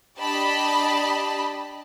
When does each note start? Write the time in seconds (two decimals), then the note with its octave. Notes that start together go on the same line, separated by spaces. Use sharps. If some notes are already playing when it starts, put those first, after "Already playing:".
0.20 D4 G4 D#5 A5 B5